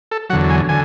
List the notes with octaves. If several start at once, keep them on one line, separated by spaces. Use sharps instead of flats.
A4
E2 D3 F#3 F#5
G#5
D3 G#5